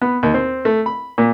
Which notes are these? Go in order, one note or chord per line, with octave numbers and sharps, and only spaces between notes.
B3
D#2
C4
A3
B5
A#2